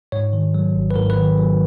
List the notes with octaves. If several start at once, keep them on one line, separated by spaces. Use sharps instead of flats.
G#2 C#5
D#3
F#3
G#1
B4
G#2 A#4
B4
D#3
F#3